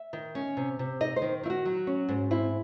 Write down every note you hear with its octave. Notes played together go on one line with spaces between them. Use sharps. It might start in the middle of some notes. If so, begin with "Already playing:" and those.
Already playing: E5
D#3
C#4
C3
C3
D#4 D#5
C5
D#3
D#3 E4
F#4
F#3
C#4
G#2
C4 E4